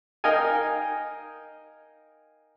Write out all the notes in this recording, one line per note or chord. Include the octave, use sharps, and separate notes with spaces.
D#4 A#4 D#5 F5 G5 G#5